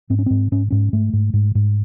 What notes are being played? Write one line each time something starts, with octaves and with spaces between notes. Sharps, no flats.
G#2 C4
C#4
G#2 C4
G#2 C#4
G#2 C#4
G#2 A3
G#2
G#2
G#2